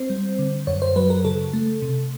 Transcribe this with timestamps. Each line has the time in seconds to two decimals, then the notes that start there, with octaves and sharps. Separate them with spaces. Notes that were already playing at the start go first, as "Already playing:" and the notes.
Already playing: C4 C5
0.10 G3
0.39 D3
0.67 F#2 C#5
0.82 C5
0.96 F#3 B4
1.10 A#4
1.25 C#3 A4
1.53 A3
1.82 C3